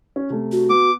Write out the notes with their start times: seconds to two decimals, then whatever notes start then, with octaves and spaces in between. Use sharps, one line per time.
0.16 C#4
0.30 C3 A3
0.52 F#4
0.70 B3 D6